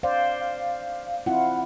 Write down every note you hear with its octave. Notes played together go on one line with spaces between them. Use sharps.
C5 D5 F5
F5
C4 E4 F4 F#5